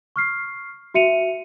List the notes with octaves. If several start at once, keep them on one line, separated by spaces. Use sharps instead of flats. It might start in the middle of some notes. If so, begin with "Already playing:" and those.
C#6 F6 C7
F#4 E5 C#7 D#7 F7